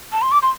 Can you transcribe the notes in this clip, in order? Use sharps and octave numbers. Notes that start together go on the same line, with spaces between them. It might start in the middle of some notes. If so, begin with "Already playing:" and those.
A5
C6
D6
C6